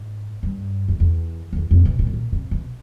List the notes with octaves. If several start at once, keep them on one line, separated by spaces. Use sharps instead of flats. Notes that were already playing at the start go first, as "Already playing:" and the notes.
Already playing: G#2
G2
F2
E2
F2
E2
F2
A#2
B2
A#2
A2
A#2
C3
B2